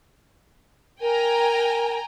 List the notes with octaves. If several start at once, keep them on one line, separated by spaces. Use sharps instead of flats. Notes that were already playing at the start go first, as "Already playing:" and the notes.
A#4 G5 G#5 A#5